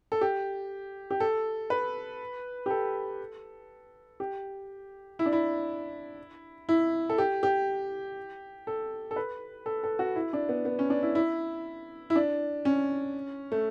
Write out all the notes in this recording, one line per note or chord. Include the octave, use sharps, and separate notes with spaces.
A4
G4
G4
A4
B4
G4
A4
G4
E4
D4
E4
E4
A4
G4
G4
A4
A4
B4
A4
A4
F#4
E4
D4
B3
B3
C#4
D4
E4
E4
E4
D4
C#4
A3